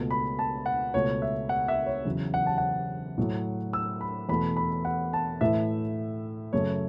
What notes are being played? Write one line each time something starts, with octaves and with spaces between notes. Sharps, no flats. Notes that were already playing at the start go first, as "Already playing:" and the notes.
Already playing: C#2 B2 A3
B5
A5
F#5
C#2 B2 A3 C#5
E5
F#5
E5
C#5
E2 C#3 F#3
F#5
A5
F#5
A2 F#3 A3
E6
B5
E2 B2 A3 B5
B5
F#5
A5
A2 E3 A3 E5
F#2 C#3 A3 C#5